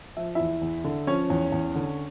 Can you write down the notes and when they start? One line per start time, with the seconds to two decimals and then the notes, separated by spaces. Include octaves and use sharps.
0.17 F3 E5
0.35 E2 E4 E5
0.62 E2
0.84 D3
1.07 F3 C#4 C#5
1.30 E2
1.52 E2
1.75 D3